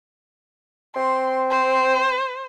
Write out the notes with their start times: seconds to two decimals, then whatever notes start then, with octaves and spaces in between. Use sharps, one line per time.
0.96 C4 C6
1.51 C5